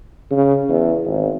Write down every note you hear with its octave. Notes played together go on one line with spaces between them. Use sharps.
C#3
E2
G#1